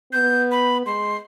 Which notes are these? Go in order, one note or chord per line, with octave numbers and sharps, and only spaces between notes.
B3 G6
B5
G#3 C6